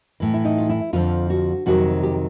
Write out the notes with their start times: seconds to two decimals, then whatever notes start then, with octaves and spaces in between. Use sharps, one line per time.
0.20 A2 E3
0.34 E4
0.45 D#4
0.58 F4
0.69 E4
0.93 F2 D3 F3 F4
1.30 F#4
1.66 F2 C3 D#3 F#3 F#4
2.03 G4